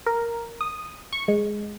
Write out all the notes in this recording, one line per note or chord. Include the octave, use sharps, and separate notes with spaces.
A#4
D#6
C#6
G#3